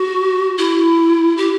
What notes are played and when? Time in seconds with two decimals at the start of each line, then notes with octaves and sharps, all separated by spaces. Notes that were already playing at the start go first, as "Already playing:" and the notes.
Already playing: F#4
0.58 E4
1.37 G4